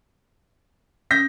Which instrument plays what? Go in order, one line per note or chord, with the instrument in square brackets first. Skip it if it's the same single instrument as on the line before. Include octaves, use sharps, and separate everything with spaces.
[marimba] C#4 [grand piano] G6 A#6 B6